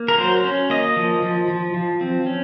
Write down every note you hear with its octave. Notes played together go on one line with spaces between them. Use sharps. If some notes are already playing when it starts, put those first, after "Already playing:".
Already playing: A#3
A#4
F#3 C5
C#4
A#3 D#5
F3
F3
F3
F3
C4
C#4